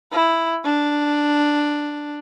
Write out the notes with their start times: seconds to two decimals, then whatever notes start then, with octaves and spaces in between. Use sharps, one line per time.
0.12 E4
0.65 D4